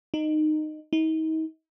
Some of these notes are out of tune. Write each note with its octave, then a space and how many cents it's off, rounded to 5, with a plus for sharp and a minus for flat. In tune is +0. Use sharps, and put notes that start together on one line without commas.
D#4 -15
D#4 +40